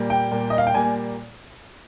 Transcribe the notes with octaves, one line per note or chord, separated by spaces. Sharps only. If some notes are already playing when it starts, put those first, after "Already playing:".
Already playing: A#2 G3 A#3
G5
A#2 G3 A#3
D#5
F5
G5
A#2 G3 A#3 G#5